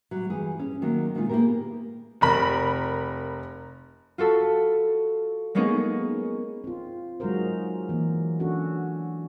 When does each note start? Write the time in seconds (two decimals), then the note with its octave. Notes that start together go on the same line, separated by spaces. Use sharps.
0.11 F#3 G3
0.30 G2 E3 G3 G#4
0.59 C#4
0.82 D#3 F#3 A#3
1.15 A#2 D#3 G#3 D4 D#4 F4
1.29 A#3 B3 G4 G#4 A#4
2.21 F1 A#4 B5
4.18 F4 F#4 A4 B5
5.55 G#3 A#3 B3 C#4 D#4 G#4
6.64 C4 F4
7.20 F#3 G#3 D#4 F#4 A#4 C5
7.89 E3 A#3
8.39 C#4 D4 F#4 A4